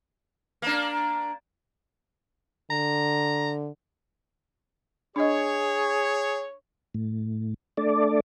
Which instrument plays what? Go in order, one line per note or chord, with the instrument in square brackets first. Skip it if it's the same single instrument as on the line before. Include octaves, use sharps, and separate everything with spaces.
[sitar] A#3 D4
[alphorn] D3 [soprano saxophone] A#5
[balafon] D4 D#5 [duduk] G#4 [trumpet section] C#5
[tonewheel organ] A2
A3 D4 D5